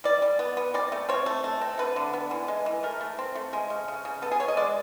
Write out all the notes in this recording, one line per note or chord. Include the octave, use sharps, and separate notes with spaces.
G3 D5
G3
B3
B3
C4 D5
A3
C4 C#5
A3
A3
C4
D3 B4
D3
B3
E3
G#3
E3
A3 A#4
A3
C4
A3
G#3
C#3
C#3
C#3
B3 A4
G#4
B3 C#5
D#5
G#3 D5